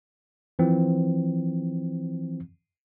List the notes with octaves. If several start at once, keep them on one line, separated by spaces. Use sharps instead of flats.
E3 F3 C4